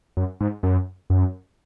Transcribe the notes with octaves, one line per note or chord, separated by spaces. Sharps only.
F#2
G#2
F#2
F#2